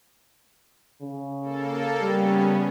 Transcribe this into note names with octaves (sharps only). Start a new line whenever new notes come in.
C#3
A#3 A4
C#3 G3 B3 C#4